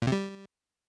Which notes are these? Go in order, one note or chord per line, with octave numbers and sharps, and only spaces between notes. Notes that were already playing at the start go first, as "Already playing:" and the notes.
A#2
C3
G3